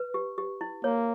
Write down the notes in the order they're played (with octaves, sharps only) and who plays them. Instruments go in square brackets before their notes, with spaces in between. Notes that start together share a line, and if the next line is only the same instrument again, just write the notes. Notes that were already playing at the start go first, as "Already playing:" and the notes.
Already playing: [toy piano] B4
G4
G4
E4
[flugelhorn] A#3 [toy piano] C#5